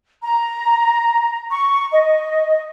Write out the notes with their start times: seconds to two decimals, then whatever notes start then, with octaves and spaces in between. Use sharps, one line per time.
0.23 A#5
1.51 C#6
1.91 D#5